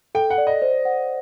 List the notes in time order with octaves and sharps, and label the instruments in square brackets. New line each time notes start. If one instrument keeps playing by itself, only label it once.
[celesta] A4 [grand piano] G5
[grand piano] F#5
[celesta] D5
[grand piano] D#5
[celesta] C5
F#5